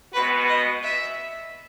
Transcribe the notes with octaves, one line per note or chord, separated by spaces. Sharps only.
B2 G#3 B3 F#4 B4
D#5
E5